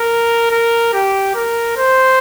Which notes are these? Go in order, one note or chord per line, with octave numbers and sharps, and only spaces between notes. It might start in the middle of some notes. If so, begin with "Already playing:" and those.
Already playing: A#4
A#4
G4
A#4
C5